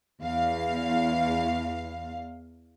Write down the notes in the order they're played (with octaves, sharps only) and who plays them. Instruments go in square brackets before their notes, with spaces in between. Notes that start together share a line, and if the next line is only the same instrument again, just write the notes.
[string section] E2 F5